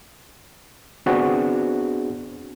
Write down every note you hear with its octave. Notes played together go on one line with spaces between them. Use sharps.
B3 C4 D4 F#4 G#4 C5